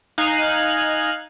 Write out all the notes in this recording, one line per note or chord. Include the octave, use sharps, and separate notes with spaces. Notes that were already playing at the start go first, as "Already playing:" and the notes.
D#4 F5 G#5 F#6